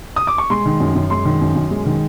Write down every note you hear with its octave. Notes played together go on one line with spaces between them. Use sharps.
D#6
D6
C#6
G#3 C6
D#3
F#2
F#2
G#3 C6
D#3
F#2
F#2
G#3
D#3